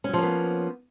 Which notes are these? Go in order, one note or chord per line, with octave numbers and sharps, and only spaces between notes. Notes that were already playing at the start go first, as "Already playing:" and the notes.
F3 F#3 A#3 B3 C#4